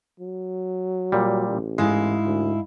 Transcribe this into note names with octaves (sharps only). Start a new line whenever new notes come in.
F#3
A#2 G3
A1
G#2 G#3 E4 F5
D2